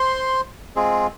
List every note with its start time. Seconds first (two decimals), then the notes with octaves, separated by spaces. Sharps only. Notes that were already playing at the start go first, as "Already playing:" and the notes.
Already playing: C5 C6
0.76 G#3 C4 F4 G#4